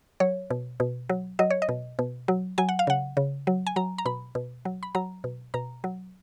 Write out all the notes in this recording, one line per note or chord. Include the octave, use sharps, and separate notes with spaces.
F#3 C#5
B2
B2
F#3
F#3 D#5
C#5
D#5
B2
B2
F#3
F#3 G#5
F#5
F5
C#3 F#5
C#3
F#3
G#5
F#3 A#5
A#5
B2 B5
B2
F#3
B5
F#3 A#5
B2
B2 A#5
F#3